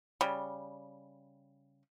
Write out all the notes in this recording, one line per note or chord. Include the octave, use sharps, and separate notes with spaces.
C#3 G3